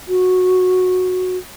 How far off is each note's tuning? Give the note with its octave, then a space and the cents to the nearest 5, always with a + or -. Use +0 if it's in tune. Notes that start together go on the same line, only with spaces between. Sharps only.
F#4 -10